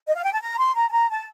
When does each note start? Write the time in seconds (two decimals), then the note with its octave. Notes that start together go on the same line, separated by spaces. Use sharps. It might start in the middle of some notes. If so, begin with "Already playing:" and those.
0.07 D#5
0.15 F5
0.24 G5
0.33 A5
0.41 A#5
0.59 C6
0.75 A#5
0.88 A5
0.92 A#5
1.09 A5